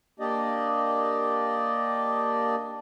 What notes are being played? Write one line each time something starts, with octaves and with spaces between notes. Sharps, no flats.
A#3 D4 G4 D5 D#5